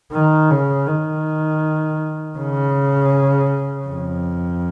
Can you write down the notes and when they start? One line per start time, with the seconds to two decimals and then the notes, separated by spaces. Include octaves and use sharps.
0.12 D#3
0.50 C#3
0.87 D#3
2.38 C#3
3.88 F2